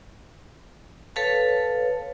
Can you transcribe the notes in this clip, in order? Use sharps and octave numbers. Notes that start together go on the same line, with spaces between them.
A4 B4 C#5 F5 A5